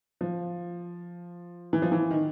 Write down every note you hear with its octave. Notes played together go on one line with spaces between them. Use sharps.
F3
E3
F3
E3
D#3